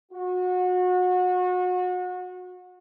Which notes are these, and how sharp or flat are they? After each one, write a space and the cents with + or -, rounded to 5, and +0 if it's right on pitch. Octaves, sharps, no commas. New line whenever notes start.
F#4 -30